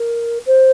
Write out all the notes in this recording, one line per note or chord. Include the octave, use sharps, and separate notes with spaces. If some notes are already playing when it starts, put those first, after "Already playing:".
Already playing: A#4
C5